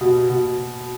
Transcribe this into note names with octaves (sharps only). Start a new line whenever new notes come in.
B2
B2